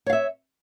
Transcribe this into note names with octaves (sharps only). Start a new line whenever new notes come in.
C#5 E5 F5